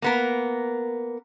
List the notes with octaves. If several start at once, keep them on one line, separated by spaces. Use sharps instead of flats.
A#3 B3 A#4